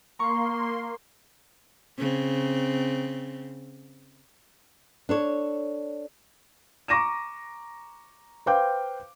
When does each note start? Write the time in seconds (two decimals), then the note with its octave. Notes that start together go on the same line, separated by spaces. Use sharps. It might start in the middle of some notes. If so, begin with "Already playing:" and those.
0.19 A#3 A#5 C6 C#6
1.98 C#3 C4
5.09 D4 A4 C#5
6.88 A#5 C#6 D6 A#6 D#7 E7
8.46 B4 C5 F5 G5 D6 G6